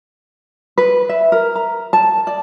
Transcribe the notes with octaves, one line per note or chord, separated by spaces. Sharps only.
B4
E5
A#4
A#5
A5
D5